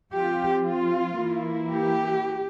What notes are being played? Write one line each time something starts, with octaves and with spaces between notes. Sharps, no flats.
F3 C4 F4 G4
F4
E3 A#3 E4
G4